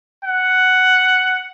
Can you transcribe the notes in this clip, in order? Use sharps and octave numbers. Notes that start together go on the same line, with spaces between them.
F#5